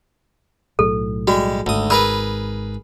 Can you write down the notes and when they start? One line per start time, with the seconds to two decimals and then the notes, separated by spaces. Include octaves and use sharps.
0.79 B1 A2 F#3 A4
1.27 G3 G#3 F#4
1.66 G#1 D2 G#2 D#6
1.90 G#4 A#4 B4 B5 E6